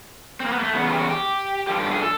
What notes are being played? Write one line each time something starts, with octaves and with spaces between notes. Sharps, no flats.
C4
A#3
B3
A#3
A3
E2 C#3 B3
F4
G4
F#4
G4
G2 D3 F3 G4
G4
G#4
A4